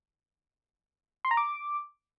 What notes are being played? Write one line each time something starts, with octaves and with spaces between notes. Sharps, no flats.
C6
A#5
D6